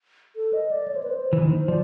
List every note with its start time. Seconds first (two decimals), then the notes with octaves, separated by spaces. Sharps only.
0.36 A4
0.53 D#5
0.71 D5
0.88 C#5
0.95 C5
1.03 B4
1.10 C5
1.33 E3
1.41 D#2 D#3 C5
1.68 F3 D5